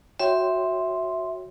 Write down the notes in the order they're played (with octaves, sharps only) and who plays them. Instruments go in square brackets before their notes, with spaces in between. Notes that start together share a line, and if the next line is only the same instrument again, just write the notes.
[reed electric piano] F#4 C#5 G5 [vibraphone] E5 C6